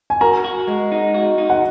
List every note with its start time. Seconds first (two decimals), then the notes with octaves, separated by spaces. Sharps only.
0.10 G#5
0.21 F#4 A#4 A#5
0.44 F#4
0.67 G#3
0.92 D#4
1.14 F#4
1.38 D#4
1.50 F#5